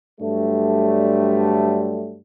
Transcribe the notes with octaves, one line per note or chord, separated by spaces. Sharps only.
G2 D3 F#3 G3 A3